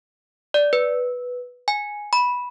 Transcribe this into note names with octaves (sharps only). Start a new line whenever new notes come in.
D5
B4
G#5
B5